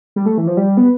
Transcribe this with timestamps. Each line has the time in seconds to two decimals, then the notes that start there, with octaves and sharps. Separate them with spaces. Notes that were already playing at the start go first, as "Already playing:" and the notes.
0.16 G3
0.26 A3
0.38 E3
0.47 F3
0.57 G3
0.77 B3